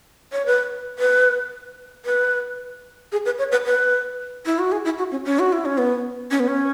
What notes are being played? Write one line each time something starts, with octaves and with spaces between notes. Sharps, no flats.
C#5
B4
B4
B4
G#4
B4
C#5
B4
B4
E4
F#4
G#4
E4
F#4
C#4
C#4
F#4
E4
C#4
B3
C#4
B3
C#4